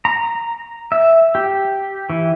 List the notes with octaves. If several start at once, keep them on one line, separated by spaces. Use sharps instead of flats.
A#5
E5
G4
E3